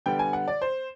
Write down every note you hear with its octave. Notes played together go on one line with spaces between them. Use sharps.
D3 G3 B3 G5
G#5
F#5
D5
C5